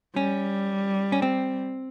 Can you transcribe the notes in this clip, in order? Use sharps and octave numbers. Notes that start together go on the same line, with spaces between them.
G3 C#4
C#4
C4